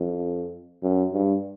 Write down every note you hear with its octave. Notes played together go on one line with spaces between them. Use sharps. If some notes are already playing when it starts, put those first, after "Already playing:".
Already playing: F2
F#2
G2